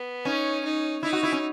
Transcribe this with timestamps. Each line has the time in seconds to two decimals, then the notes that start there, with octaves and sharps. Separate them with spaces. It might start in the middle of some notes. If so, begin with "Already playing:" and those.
Already playing: B3
0.25 C#4 D#4
0.64 D#4
1.03 D#4 E4
1.13 F#4
1.23 E4
1.32 C#4